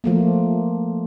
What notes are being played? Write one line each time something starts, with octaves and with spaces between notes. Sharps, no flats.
F3 A3 A#3